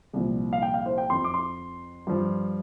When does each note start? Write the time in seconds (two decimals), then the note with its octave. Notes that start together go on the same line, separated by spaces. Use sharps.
0.13 C2 A#2 F3
0.53 F5
0.62 G5
0.74 F5
0.86 C5
0.98 G5
1.10 F2 F3 C6
1.24 D6
1.34 C6
2.07 G2 F3